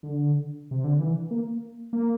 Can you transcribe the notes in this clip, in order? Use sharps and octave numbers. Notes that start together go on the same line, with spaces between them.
D3
C3
D3
E3
A#3
A#3